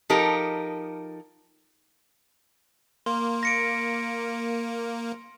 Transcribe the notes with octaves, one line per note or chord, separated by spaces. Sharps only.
F3 D#4 G4 A4 A#4
A#3 C6
A#6 C#7 D7